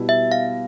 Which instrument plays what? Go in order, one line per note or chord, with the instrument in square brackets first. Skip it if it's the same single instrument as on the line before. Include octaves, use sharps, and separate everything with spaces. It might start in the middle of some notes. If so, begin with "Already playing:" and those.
Already playing: [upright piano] B2 G3 B3 E4
[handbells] E5
F5